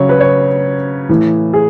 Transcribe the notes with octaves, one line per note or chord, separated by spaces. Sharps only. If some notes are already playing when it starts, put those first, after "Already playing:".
Already playing: C#3 F#3 C#5
B4
C#5
A2 E3
G#4